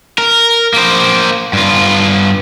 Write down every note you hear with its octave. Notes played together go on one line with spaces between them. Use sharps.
A#4
A#3 C5
G2 F4